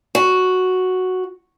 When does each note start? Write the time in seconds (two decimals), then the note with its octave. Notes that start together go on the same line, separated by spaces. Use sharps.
0.15 F#4